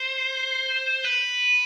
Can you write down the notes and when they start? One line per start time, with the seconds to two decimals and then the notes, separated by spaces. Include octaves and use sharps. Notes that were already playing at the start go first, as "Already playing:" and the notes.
Already playing: C5
1.05 B4